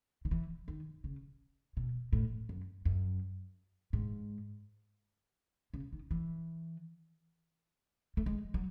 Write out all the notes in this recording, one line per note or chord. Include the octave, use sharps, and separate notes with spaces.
D#3
E3
D#3
C#3
B2
A2
F#2
F#2
G#2
C#3
D#3
E3
A3
G#3
F#3